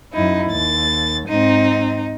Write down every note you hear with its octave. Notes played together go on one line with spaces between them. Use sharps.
F#2 D#4 E4
D#2 A6
G#2 C4 D#4